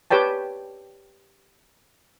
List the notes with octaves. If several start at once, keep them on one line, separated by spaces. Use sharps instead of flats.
G4 B4 C#5 G5 A5